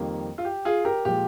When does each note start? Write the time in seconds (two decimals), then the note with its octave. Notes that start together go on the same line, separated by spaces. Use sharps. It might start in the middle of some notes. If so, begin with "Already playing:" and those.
Already playing: F2 D#3 G3 A#3
0.38 F4
0.45 G4
0.65 F4 G#4
0.85 G4 A#4
1.05 A#2 F3 G#3 G4